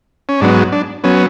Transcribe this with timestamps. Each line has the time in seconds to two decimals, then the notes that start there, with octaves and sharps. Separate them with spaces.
0.29 C#4
0.41 G#2 F#3 B3 D4
0.72 D4
1.04 F#3 B3 C#4